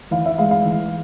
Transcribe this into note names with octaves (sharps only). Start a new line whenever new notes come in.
E3 F5
E5
G#3 F5
F5
E3